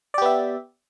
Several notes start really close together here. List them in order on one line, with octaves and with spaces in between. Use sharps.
D5 G4 B3 E5